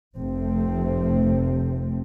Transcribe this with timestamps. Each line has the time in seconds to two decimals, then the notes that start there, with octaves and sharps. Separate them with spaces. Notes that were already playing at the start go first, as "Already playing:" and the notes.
0.17 F1 C3 F3 A3 C4